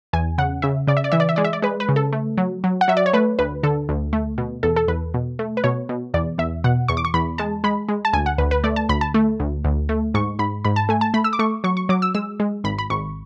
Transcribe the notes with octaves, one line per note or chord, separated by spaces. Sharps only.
E2 G#5
C#3 F#5
C#3 E5
C#3 D5
E5
D5
E3 E5
D5
E5
G#3 D5
E5
D5
G#3 B4
B4
C#3
A4
A3
F#3
F#3
F#5
F#3 E5
D5
C#5
A3 B4
D2 B4
D3 A4
D2
A3
B2
E2 A4
A4
E2 B4
B2
A3
B4
B2 C#5
B2
E2 D5
E2 E5
B2 F#5
E2 C#6
D6
C#6
E2 B5
G#3 A5
G#3 B5
G#3
A5
D2 G#5
F#5
D2 B4
B4
A3 D5
A5
D2 B5
A5
A3
D2
D2
A3
G#2 C#6
G#2 B5
G#2 B5
A5
A3 G#5
A5
A3 B5
E6
D6
A3 C#6
F#3 C#6
C#6
F#3 D6
E6
G#3 E6
G#3
G#1 B5
B5
G#1 C#6